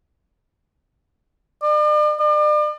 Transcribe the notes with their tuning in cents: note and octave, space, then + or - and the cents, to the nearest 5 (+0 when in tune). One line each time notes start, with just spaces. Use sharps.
D5 +40
D5 +40